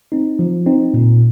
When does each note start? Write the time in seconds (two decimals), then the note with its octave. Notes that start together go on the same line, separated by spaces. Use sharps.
0.12 C4 D#4
0.39 F3
0.66 C4 D#4
0.94 A#2